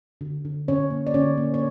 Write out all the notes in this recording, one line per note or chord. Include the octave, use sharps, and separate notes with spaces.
D3
D3
D3 C#4 C#5
A#3
D5
D3 C#4 C#5
A#3
C#5